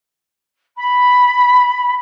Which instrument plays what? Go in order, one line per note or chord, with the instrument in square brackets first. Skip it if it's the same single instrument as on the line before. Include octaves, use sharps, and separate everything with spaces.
[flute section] B5